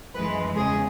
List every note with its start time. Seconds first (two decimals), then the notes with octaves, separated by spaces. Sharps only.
0.14 F#2 E3 G#3 B4
0.57 E2 C#3 G#4